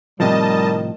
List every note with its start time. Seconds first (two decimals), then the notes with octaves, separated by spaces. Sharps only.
0.20 A2 C3 D#3 F3 G3 D#5 A5